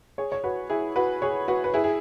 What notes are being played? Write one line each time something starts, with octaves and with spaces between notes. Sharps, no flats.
G#4 C#5
C#5
F#4 B4
E4 G#4
F#4 B4
G#4 C#5
F#4 B4
B4
E4 G#4
G#4